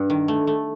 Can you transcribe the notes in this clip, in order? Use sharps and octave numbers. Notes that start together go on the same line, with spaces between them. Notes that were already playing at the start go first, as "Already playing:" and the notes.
Already playing: G2
D#3
A3
A3